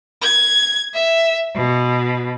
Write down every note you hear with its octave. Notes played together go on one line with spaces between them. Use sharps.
G#6
E5
B2